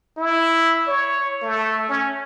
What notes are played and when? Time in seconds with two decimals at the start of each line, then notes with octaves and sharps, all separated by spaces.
0.18 E4
0.87 C#5
1.42 A3
1.89 C#4